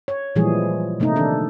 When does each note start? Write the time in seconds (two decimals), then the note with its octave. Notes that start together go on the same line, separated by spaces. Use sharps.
0.08 C#5
0.36 A#2 E3 F3 G3 G#3 G#4
1.00 C3 A3 A#3 D#4
1.16 D#3 D4 A4